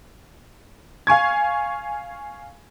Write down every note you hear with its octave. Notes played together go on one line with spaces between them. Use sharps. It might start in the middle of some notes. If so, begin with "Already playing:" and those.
F5 G#5 C#6 G#6